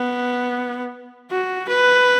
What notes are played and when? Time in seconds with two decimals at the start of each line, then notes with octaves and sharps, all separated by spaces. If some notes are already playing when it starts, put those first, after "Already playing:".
Already playing: B3
1.31 F#4
1.69 B4